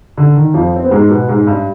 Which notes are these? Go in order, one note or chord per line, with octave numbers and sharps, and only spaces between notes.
D3
D#3
F2 F3
C4
B3
G#2 G#3
B2 B3
G#2 G#3
G2 G3